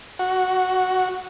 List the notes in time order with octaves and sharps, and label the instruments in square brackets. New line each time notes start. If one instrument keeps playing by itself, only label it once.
[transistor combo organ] F#4